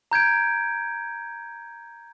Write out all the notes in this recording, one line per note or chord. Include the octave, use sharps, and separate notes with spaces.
A#5 G6 G#6 D7